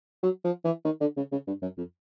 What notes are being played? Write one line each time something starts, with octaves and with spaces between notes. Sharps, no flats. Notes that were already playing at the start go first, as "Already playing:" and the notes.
F#3
F3
E3
D#3
D3
C#3
C#3
G2
F#2
F2